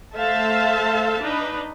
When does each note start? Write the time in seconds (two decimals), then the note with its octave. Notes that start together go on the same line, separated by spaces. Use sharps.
0.16 A3 A4 C5 E5 F5 A5
1.21 D4 D#4 B4